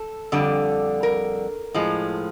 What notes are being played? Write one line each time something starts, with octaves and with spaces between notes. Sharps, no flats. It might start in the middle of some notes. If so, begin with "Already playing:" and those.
Already playing: A4
F2 D3 G3
A#4
A2 F3 G#3